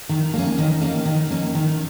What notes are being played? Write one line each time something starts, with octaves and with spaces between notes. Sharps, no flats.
D#3
A#3 C#4
D#3
A#3 C#4
D#3
A#3 C#4
D#3